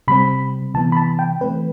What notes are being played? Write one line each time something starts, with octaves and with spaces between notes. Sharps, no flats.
C3 G3 C4 B5
C3 E3 B3 A5
B5
A5
G5
E3 A3 C4 B4